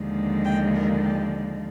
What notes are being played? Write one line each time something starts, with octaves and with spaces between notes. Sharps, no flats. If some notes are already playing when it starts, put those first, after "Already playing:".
Already playing: D#2 D3 F3 G#3
G5
A#4
G4